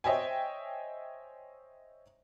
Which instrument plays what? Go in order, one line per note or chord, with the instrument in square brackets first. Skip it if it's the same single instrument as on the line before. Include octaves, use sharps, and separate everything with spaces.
[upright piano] C5 C#5 D#5 E5 G5 G#5